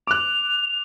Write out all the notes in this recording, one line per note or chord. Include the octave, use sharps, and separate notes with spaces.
D6 F#6 F7